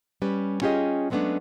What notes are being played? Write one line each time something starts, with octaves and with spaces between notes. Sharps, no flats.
G3 C#4 B4
C#4 F4 G4 G#4 D#5
F#3 G#3 A3 B3 C#4 D4